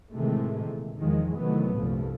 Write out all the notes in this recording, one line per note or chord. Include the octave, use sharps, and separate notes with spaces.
A2 C3 D#3 E3 G#3 A3
A#2
E2 D#3 F3 G#3
C3 D#3 E3 F#3 A3 B3
C2 G2 A#2 F3 A3